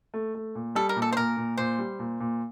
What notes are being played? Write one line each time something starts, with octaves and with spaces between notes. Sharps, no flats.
A3
A3
A#2
G3 A4
A#4
A#2
A4
C5
A#2 A#4
A#2
A#2 C5
G3
A#2
A#2